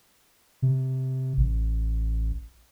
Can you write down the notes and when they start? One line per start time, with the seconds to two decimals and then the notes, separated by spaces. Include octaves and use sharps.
0.62 C3
1.37 A1